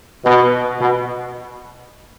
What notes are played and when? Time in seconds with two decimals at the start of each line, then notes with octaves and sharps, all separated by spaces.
0.23 B2
0.80 B2